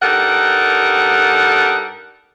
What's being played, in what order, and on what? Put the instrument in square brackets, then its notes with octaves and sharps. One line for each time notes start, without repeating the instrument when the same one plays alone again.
[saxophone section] G2 G3 D#4 A4 A#4 F#5